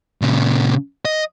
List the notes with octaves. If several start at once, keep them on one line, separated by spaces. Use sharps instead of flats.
A#2 C#3
D#5